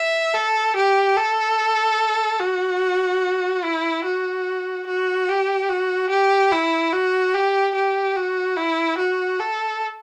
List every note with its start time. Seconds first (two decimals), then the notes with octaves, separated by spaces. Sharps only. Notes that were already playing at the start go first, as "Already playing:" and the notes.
Already playing: E5
0.34 A4
0.76 G4
1.16 A4
2.40 F#4
3.64 E4
4.05 F#4
4.87 F#4
5.29 G4
5.69 F#4
6.10 G4
6.52 E4
6.93 F#4
7.35 G4
7.75 G4
8.16 F#4
8.57 E4
8.98 F#4
9.40 A4